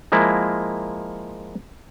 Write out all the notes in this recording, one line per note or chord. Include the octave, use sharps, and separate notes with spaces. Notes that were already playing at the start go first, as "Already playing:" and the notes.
F3 G#3 A#3 E4